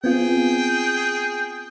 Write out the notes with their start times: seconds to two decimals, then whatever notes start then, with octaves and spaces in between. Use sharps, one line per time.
0.04 B3 C4 F4 G#4 G5